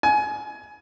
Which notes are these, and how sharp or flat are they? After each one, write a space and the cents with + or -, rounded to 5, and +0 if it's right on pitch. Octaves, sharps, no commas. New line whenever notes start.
G#5 +25